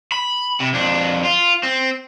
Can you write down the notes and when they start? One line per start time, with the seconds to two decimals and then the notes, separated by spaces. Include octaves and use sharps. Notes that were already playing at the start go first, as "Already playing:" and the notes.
0.12 B5
0.60 C3
0.73 F2 D4
1.24 F4
1.63 C4